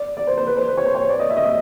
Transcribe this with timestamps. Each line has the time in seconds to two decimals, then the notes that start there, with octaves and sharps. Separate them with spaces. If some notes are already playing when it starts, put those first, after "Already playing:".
Already playing: D5
0.17 D5
0.27 C5
0.37 C5
0.47 B4
0.57 C5
0.68 B4
0.77 C#5
0.86 C5
0.95 C#5
1.09 D5
1.19 D#5
1.30 E5
1.37 D#5
1.45 E5